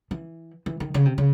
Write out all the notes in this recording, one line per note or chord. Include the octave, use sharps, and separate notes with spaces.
E3
E3
D#3
C#3
C3
C#3